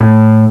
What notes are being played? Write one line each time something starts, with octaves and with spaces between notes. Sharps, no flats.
A2